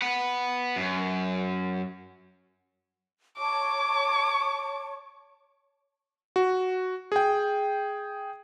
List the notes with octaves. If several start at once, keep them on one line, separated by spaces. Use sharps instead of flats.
B4 F#5
F#2
C#5 A5 C#6 D6
F#4
G#4 G5